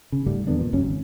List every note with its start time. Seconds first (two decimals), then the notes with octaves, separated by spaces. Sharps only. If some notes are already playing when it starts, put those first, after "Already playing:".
0.12 C#3
0.26 G#2 C#3 G3 A3
0.47 E2 D3 B3 D4
0.60 A#2
0.73 C#2 F#2 C#4
0.85 G#1